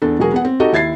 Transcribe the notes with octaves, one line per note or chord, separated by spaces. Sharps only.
E2 D4 A4
E1 F#3 F#4 G#4 A#4
B3 G#4 F#5
C4
D#4 F#4 G4 A4 D#5
D#2 E4 G#6 A6 C7